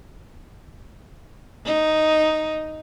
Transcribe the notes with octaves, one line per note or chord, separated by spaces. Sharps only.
D#4